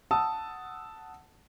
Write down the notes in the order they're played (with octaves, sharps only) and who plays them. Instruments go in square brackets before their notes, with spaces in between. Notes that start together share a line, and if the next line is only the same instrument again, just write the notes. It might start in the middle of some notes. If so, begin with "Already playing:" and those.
[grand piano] F#5 A5 D#6 E6